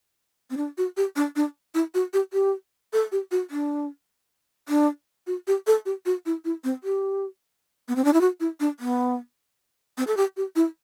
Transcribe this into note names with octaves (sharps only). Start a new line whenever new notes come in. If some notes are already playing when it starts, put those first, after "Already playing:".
C4
D4
F#4
G4
D4
D4
E4
F#4
G4
G4
A4
G4
F#4
D4
D4
F#4
G4
A4
G4
F#4
E4
E4
C4
G4
B3
C4
D4
E4
F#4
E4
D4
B3
C4
A4
G4
G4
E4